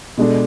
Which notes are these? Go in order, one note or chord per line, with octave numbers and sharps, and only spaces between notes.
B2 G#3 D4 A4